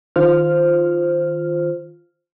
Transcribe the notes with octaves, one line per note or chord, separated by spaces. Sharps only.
D#3 F4 C5 F6